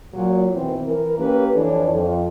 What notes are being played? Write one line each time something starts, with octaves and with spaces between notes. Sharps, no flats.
A#2 F#3
B2 D#3 E3 C4
E3 A#4
A#3 C#4 G4 B4
F2 E3 D4 A4 C#5
F2